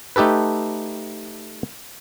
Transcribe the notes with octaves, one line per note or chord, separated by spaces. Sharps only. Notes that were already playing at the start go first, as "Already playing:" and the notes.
A3 D#4 G4 A4 B4